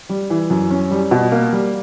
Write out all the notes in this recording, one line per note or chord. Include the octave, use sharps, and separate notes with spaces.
G3
E3
F#2
C#4
G3
B2
A#3
G3